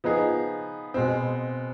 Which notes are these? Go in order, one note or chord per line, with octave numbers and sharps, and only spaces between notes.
F3 B3 D#4 G#4
B2 G#3 C4